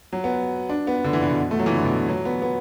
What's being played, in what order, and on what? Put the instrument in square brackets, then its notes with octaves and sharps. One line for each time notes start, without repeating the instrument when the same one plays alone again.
[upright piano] F#3
B3
D4
B3
D3
E3
D3
B2
A3
F#3
E3
D3
B2
F#3
B3
B3